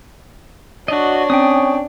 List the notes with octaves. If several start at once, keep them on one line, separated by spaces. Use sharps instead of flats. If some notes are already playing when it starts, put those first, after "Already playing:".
D4 F#4 C#5 D#5
C4 C#4 G5 D#6